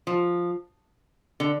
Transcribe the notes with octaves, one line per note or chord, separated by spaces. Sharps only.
F3
D3